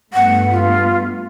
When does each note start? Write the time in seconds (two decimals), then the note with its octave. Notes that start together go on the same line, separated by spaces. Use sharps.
0.13 G2 A3 B3 F#5
0.50 F4